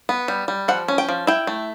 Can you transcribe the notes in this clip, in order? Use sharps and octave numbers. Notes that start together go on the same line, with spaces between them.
B3
G3
G3
F3 F#5
C#4
G5
F3
E4 G5
A3